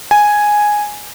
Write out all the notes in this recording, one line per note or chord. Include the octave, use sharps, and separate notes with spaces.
G#5